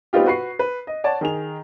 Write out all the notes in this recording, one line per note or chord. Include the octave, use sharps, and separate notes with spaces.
G3 B3 C4 D#4 F4 G4
F#4 B4 C#6 C7
B4
D#5
C#5 D5 F#5 A5
D#3 G#4 F7